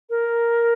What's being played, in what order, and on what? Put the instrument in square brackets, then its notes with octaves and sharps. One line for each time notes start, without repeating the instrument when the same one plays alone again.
[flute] A#4